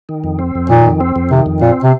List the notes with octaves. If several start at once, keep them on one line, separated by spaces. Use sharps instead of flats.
D#3
F2
C4
F2
A#2 D#3
F2
C4
F2
C3 D#3
F2
A#2 C4
C3